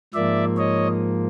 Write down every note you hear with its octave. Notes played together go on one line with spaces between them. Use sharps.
G#2 F3 A#3 D5 E5
C#5 D#5